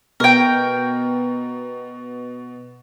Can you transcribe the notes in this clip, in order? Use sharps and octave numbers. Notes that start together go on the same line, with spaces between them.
B2 A#4 G5